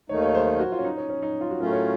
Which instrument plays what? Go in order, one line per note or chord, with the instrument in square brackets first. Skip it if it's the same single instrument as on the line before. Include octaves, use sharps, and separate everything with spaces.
[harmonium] D#2 D#3 A3 D#4 [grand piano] C#5
[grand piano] C#5
C5
A#4
F#4
F4
C#4
D#4
C#4
C#4
D#4
F4
F#4
[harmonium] A2 F#3 A3 C#4 F4 [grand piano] A#4
[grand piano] C#5